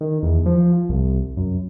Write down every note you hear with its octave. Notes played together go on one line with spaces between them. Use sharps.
D#3
E2
F3
C2
F#2